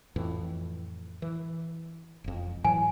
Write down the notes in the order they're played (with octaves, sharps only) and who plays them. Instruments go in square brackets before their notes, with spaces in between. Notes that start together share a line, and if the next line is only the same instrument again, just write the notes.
[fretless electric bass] F2 A2 E3
E3
E1 F2
[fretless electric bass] A2 E3 F#3 [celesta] G#5